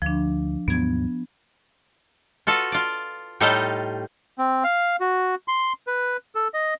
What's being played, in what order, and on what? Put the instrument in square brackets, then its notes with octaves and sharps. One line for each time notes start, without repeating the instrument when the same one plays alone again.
[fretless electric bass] D2 [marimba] F3 D4
[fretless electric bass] D#2 G#2 F#3 [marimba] B3 G#6
[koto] F4 F#4 A4 B4
F4 D5
A2 G3 D#4 F4 A4 D#5
[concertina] C4
F5
F#4
C6
B4
A4
D#5